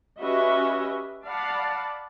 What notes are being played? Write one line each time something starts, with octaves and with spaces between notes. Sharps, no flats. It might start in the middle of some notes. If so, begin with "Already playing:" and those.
C#4 F#4 G4 B4 D#5 E5
D5 F5 F#5 A5 B5